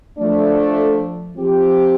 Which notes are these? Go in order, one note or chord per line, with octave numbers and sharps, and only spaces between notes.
F3 A3 D4
F3 C4 G4